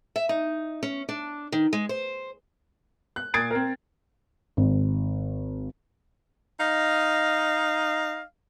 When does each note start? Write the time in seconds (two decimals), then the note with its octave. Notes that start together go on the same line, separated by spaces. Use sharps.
0.16 E5
0.29 D#4
0.83 C#4
1.09 D4
1.52 D#3
1.73 G#3
1.89 C5
3.16 F#6
3.34 A#2 D#6 G#6 A6 C7 D7
3.51 C4 A#4
4.57 G#1
6.60 D#4 D#5 F5